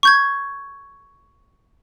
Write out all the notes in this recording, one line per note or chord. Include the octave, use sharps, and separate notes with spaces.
C#6 G6 G#6